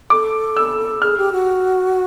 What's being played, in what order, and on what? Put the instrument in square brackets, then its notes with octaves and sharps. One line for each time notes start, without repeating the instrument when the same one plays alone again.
[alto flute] A4 [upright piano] D6
[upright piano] E6
[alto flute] G#4 [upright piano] F6
[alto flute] G4
F#4